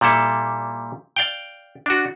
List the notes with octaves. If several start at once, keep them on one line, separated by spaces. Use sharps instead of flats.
A#2 G3 E4 A4
D5 F5 G5
D4 F#4